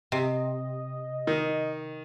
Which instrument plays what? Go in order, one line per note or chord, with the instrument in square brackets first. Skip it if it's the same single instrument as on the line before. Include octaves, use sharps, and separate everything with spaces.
[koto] C3 [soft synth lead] D#5
[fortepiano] D#3